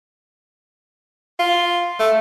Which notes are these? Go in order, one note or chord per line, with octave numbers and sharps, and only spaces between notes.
F4
A3